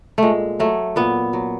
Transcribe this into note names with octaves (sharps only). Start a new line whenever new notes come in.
A#2 G#3 A3
F#3 A3
A#2 B3
F#3